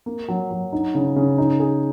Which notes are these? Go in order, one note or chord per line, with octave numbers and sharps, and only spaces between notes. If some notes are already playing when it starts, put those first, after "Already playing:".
A#3
F#3
F#3
D#4
C#3
C#3
D#4
G#4